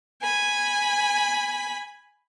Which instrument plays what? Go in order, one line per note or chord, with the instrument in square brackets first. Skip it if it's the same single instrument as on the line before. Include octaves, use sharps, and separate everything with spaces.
[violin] G#5 B5